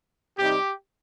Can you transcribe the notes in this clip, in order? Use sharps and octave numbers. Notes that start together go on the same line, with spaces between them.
C3 G3 D#4 G4